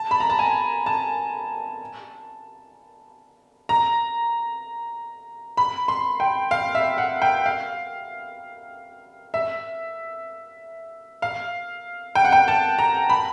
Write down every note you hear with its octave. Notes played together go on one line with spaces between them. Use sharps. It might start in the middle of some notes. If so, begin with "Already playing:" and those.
Already playing: A5
B5
A#5
A5
G#5
A5
A#5
B5
C6
G5
F5
E5
F#5
G5
F5
E5
F5
G5
F#5
G5
A5
A#5
B5